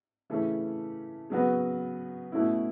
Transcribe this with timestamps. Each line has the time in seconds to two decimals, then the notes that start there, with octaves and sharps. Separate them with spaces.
0.30 C#3 E3 A3 C#4
1.30 C#3 F#3 B3 F#4 B4
2.32 B2 A3 C#4 E4